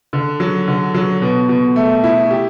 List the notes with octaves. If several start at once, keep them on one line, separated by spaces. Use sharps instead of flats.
D3
F#3
D3
F#3
B2
B2
A3
E4
G4